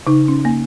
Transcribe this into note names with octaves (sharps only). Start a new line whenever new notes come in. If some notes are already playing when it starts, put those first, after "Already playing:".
C#3 D#4
C#4
A#3